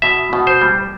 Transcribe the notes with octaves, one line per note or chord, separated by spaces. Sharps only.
B2 E5
B2
C5
G3